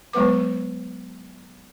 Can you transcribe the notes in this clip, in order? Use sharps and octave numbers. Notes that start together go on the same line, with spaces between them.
F#3 G#3 B3 B4 D6